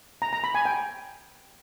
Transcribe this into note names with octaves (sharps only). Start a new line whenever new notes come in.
A#5
A#5
B5
G#5
G5